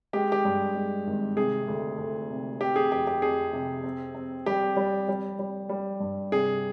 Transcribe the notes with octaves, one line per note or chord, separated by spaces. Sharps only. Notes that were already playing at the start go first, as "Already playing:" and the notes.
G#3 G4
G4
G2
G#3
G#1
C3 G#4
D2
D2
C3
C4 G4
G#4
F2 G4
G4
F2 G#4
C3
C4
C4
G3 G4
G3
G3
G3
G3
G2
C3 G#4